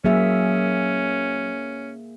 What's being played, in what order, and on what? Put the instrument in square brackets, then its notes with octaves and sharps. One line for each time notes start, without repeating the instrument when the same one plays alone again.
[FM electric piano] F#3 [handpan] A#3 G#4 E5 [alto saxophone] C#4